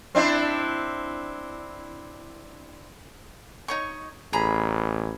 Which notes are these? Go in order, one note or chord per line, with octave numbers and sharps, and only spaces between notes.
C4 D4 E4
D#4 C#5 C#6
A1 G#4 A#5 B5